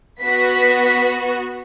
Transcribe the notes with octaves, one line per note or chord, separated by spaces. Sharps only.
B3 F#4 B6
B6
B6